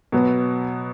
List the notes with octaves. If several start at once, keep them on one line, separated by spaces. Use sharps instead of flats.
B2 F#3 B3